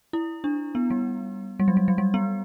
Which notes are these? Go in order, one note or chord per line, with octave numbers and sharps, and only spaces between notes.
E4
D4
B3
G3
G3
F#3
G3
F#3
G3
B3